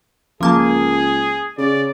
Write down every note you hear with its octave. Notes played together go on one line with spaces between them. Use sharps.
C#2 F3 A#3 G#4 A5
C#3 D5